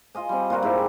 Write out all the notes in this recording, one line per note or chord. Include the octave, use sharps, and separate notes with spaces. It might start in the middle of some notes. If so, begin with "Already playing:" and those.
F4 D#5 G#5
G3 C4
A#2 F4 F#4 A#4
G#2 E4 G4 A#4